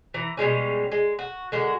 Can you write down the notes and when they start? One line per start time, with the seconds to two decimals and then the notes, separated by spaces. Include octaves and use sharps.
0.14 E3 A#5
0.37 B2 G3 G#3 C#4
0.92 G#3
1.19 F#4
1.52 D3 G#3 F#4 A#4